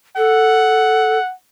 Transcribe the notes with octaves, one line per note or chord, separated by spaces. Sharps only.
A4 F#5